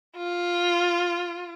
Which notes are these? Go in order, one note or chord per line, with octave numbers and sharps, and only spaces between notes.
F4